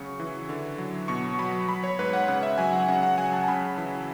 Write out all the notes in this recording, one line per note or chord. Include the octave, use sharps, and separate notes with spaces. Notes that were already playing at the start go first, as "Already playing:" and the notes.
Already playing: C#3 F#3 C#6
E3
D3
F#3
B2 C#6
F#3 B5
F#3 B5
C#5
G#2 B4
F#5
C#3 F#5
E5
F#3 G#5
F#5
C#3 F#5
F#5
F#3 G#5
A5
A5
C#3 B5
E3